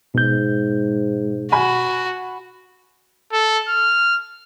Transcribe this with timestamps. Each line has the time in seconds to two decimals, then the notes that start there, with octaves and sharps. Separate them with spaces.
0.15 G#2 B2 G6
1.52 F#4 G#5 B5
3.32 A4
3.69 F6